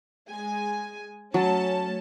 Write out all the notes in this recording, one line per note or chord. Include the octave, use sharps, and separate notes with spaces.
G#3 G#5
F#3 A3 C#4 A5